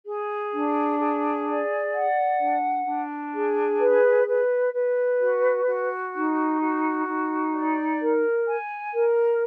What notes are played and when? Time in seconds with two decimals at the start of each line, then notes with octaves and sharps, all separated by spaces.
0.05 G#4
0.52 D4
0.97 G#4
1.45 D5
1.92 F#5
2.39 D4
2.85 D4
3.33 G#4
3.79 B4
4.26 B4
4.72 B4
5.19 F#4
5.65 F#4
6.13 D#4
6.59 F#4
7.06 D#4
7.53 D5
8.00 A#4
8.47 G#5
8.93 A#4